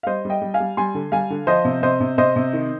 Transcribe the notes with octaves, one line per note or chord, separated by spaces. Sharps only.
F5
G3 C5 D#5
G3 D#5 G5
G3
F5 G#5
G3
G3 G#5 C6
D3
G3 F5 G#5
D3
F3 C5 D#5
C3
C3 C5 D#5
C3
C3 C5 D#5
C3
D#3